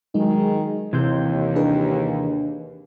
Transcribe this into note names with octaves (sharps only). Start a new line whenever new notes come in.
D#3 F#3 G#3 D#4 G#4
D#2 C3 E3 C4 C6 G6
D4 G#4 B4